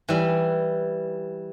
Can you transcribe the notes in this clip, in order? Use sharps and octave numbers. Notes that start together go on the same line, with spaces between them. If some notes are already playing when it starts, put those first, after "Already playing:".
E3 G3